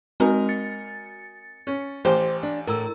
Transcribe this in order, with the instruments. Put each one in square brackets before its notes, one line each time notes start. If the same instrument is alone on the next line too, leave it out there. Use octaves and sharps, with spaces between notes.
[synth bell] G#3 C4 F#4 [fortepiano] D#4 A#4 G#5
[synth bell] A6 C#7
[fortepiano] C#4
[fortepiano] A1 G4 [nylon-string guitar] C5
[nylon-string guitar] D4
[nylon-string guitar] A2 [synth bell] A#4 A#5 E6